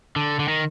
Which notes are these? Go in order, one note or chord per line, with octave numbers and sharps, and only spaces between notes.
D3
D3
D#3